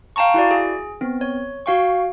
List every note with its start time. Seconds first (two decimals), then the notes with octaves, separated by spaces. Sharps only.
0.16 F5 G5 A5 A#5 C#6
0.34 E4 F#4 D5
0.51 G#4
1.01 B3 C4
1.21 C#5
1.66 F#4 F5 G5 C#6